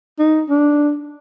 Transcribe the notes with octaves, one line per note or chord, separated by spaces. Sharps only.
D#4
D4